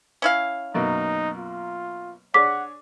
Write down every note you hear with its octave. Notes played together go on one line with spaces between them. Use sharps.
C#4 E4 F5
F#2 B2 A#3 D#4
F4
D4 G#4 C#5 F#5 D6 B6